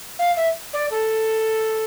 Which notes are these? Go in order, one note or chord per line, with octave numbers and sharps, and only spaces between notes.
F5
E5
D5
A4